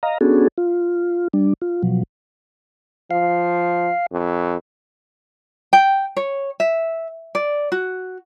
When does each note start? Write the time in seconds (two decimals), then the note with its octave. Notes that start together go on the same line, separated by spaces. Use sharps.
0.03 D#5 F5 A#5
0.21 B3 C#4 D4 F#4 G#4 A4
0.58 F4
1.33 G3 D4
1.62 F4
1.83 B2 F3 F#3
3.11 F3 F5
4.12 F2
5.73 G5
6.17 C#5
6.60 E5
7.35 D5
7.72 F#4